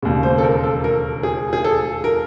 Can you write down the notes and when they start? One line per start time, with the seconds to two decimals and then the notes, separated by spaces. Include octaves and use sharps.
0.02 E1 D#2 C#3
0.23 C5
0.38 A4
0.43 A#4
0.64 A4
0.84 A#4
1.23 G#4
1.53 G#4
1.64 A4
2.04 A#4